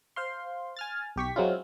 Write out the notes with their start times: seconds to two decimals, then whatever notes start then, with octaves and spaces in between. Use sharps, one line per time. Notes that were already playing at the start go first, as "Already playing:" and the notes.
0.16 C5 F5 C6
0.76 G#5 F6 A6
1.16 B1 G4 C#6 B6
1.36 F#3 G#3 C4 C#4 E4 F4